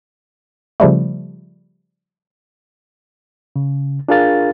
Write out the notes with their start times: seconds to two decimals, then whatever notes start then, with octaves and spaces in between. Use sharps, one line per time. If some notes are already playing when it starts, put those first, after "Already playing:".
0.80 C#3 F3 G3 A3
3.56 C#3
4.08 D4 F4 G#4 A#4 F5 A6